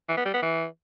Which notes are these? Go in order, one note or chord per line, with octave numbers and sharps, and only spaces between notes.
E3
B3
G3
B3
E3